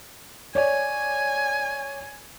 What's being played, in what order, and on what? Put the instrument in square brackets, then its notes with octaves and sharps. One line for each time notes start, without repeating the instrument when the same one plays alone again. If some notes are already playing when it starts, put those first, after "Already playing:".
[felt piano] C#5 D5 [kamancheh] G#5